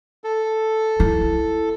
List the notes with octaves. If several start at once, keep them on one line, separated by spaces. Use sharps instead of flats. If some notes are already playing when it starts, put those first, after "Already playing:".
A4
E4